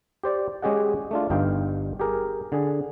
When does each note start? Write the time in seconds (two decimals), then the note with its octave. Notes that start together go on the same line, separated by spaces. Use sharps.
0.24 G4 C5 D5
0.62 G#3 C#4 G4 G#4 D#5 F#5
1.11 A3 D4 F4
1.30 G1 G2 D#4 F5 G5
2.00 G4 G#4 A#4
2.52 D3 G#4